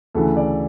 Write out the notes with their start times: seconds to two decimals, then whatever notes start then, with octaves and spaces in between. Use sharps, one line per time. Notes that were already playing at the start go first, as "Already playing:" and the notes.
0.15 D2 C#3 E3 A4
0.36 D5